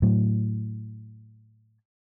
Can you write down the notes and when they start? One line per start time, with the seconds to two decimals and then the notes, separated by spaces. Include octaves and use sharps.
0.02 A2 F#3